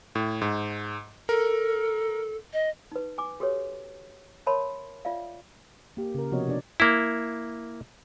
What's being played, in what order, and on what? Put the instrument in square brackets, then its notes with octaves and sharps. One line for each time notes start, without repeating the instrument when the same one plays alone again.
[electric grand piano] A2
G#2
[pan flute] A4 [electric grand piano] A#4
[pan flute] D#5
[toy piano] D#4 B4
G#5 D6
F#4 G4 A4 B4 C#5
A#4 C#5 E5 A5 B5 C6
F4 D5 E5 F5
[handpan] A#3 G4
C#3 A#4
C3 F3 B3 F#4 C#5 D#5
C3 D4 D5
[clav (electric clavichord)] A#3 E4